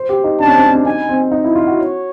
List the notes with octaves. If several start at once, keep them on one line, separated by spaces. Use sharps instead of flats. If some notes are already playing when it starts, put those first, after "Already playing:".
Already playing: C5
G4
D#4
D4 A5
C#4
C4
C#4
D4
D#4 G#5
C4
D#4
E4
F4
F#4
C#5